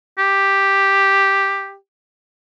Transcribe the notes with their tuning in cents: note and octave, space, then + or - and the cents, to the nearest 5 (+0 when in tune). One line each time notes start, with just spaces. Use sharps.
G4 +0